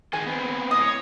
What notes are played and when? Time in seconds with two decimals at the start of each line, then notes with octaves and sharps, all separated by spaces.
0.13 D#3 G#4 D#5 G#5
0.26 B3 C4
0.71 A2 D#5 D#6
0.82 C#5